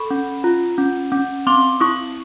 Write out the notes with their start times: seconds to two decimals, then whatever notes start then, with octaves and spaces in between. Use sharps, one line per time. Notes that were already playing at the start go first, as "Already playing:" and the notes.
Already playing: A4 B5 C#6
0.11 C#4
0.44 F4
0.78 C#4
1.12 C#4
1.47 C4 C6 D6
1.80 E4 C#6 D#6